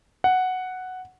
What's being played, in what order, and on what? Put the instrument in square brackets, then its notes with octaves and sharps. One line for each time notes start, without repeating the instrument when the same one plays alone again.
[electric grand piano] F#5